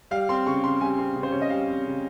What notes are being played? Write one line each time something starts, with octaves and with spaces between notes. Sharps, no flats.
G3 F5
C4 C6
C#3 C#6
C#3 C6
G3 G#5
C4
C#3
C5
C#3 C#5
D#5
G3 F5
C4
C#3